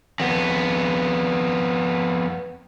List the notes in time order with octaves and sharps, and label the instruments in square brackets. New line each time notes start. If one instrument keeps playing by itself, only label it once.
[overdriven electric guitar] F2 B3